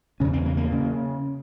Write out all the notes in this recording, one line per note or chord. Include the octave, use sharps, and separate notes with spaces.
E2 C#3 C#4
C4
A#3
A#3
C#3